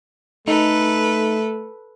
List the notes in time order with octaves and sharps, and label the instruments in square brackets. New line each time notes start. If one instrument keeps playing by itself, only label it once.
[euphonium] A3 [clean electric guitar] D#4 [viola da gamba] A4 B4